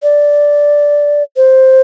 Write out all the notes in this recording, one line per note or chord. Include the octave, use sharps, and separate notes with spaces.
D5
C5